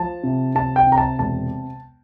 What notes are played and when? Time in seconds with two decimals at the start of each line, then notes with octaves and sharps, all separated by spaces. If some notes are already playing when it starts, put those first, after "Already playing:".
Already playing: F3 A5
0.23 C3
0.55 C3 A5
0.76 G5
0.87 C3
0.92 A#5
0.98 A5
1.19 E1 A5